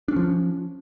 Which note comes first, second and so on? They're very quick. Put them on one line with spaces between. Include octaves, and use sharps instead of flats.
D4 C#4 F3